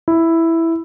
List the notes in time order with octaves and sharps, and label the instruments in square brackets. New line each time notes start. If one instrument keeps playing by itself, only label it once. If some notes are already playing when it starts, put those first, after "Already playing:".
[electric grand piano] E4